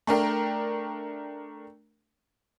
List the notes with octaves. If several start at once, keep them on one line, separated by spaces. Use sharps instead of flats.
A3 D4 A#4 G5